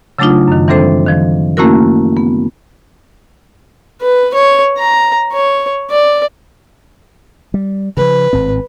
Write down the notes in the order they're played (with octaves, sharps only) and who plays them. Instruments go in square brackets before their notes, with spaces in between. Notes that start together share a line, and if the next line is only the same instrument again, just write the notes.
[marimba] C#3 F#3 A3 D4 D#4 F4
F#2 D#3
E3 G3 C4 D4 A4 C5
D#3 F3
A3 A#3 C#4 E4 F#4 A#4
B3
[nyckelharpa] B4
C#5
A#5
C#5
D5
[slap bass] G3
[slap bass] C#3 E3 F3 [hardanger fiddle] B4
[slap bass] G#1 A2 C4